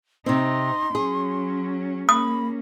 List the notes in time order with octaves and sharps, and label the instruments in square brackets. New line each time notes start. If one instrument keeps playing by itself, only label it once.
[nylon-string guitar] C3 C4 [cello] D#4 [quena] C6
[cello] F#3 C#4 [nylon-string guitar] G#4
[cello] A#3 C#4 [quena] B5 [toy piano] D#6